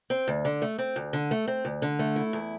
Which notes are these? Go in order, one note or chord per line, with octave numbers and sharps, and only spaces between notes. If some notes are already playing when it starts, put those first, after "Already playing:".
C4
D2
D3
A3
C4
D2
D3
A3
C4
D2
D3
A3
E4
E2